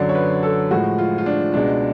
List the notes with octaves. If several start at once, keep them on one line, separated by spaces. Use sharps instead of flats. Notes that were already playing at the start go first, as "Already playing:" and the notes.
Already playing: F#2 D3 F#3 D5
C#5
B4
A4
A2 F3 G#3 F#4
F4
F4
D4
C#2 B2 G#3 D4